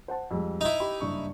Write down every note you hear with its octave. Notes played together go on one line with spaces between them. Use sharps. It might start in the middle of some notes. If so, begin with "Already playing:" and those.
C5 F#5 A5
F2 G3 G#3
D#4 E4
G4 B5
F#1 G2 C#6